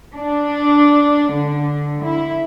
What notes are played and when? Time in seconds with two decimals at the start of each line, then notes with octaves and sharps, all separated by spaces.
0.17 D4
1.32 D3
2.03 E4